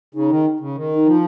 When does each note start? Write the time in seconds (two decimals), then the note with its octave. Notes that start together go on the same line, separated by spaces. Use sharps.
0.15 C#3 D#4
0.30 D#3
0.60 C#3
0.75 D#3
0.95 D#4
1.06 F3